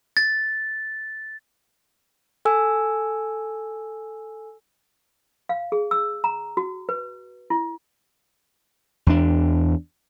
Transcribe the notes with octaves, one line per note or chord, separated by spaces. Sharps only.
A6
A4 G#5 E6
F5
G#4
E6
A#5
F#4
B4
E4
E2 D4